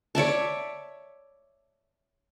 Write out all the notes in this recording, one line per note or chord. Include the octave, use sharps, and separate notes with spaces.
C#5 D5 E5 A5